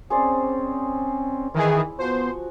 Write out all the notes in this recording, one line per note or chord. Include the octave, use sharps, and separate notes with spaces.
C4 C#4 G#4 C5 D5
D#3 E3 E4 G#4
F3 B3 F#4 C5 C#6